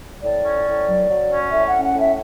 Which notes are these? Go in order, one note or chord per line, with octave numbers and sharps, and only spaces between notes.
A2 D5
C#4
A2
F#3
F#3
C#4
A2 E5
F#5
C#4
F#5
A2
E5